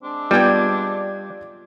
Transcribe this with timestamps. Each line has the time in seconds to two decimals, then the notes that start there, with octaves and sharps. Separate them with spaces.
0.04 G#3 C4 D4
0.31 G3 B3 F4 D5 G5 G#6